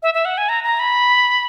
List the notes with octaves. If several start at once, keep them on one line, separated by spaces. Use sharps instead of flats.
E5
E5
F#5
G#5
A#5
A#5
B5